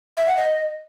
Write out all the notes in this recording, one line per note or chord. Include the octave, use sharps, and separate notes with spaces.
E5
F#5
D#5